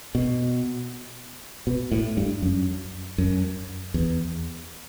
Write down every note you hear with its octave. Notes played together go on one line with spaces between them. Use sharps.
B2
B2
A2
G2
F#2
F#2
E2